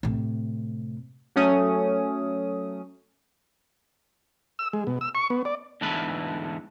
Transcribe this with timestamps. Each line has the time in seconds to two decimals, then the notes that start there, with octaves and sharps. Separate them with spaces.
0.03 A2 C3
1.36 F#3 A3 C#4 D#6
4.59 E6
4.73 G#3
4.87 B2
5.01 E6
5.15 C#6
5.30 B3
5.45 D5
5.81 E2 G#2 D3 E3 A3 B4